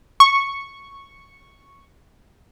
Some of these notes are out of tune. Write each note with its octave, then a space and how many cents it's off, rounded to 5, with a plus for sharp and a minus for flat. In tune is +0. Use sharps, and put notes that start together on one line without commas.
C#6 -5